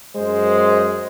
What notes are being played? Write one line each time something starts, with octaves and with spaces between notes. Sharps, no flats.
F#2 G#3 C5